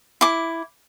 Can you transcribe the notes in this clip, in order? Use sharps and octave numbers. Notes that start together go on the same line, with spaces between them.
E4 D6